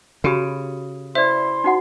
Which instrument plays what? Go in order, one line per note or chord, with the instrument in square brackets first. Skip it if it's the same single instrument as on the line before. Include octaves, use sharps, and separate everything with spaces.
[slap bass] C#3 [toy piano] F#4 G4 B5
[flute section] E4 C6 [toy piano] B4 D5 [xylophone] C5 E5
[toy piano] D#4 F#4 F#5